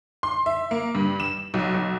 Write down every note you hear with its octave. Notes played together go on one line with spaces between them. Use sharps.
C6
E5
A#3
G2
E7
B1
B1